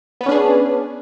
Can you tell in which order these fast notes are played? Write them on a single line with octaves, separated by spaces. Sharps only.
B3 B4 C#4 D4 G#4